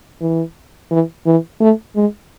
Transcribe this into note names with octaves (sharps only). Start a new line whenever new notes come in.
E3
E3
E3
A3
G#3